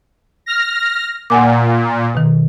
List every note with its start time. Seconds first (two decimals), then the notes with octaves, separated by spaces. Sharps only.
0.46 F6 A#6
1.30 A#2 F#5 G#5 D6
2.15 B2 D#3